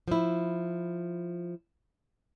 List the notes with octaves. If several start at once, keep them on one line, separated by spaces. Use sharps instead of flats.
F3 E4